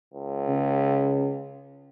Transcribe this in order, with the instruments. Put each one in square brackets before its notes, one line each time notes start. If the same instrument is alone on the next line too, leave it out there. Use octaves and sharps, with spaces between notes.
[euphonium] C#2
[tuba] C#3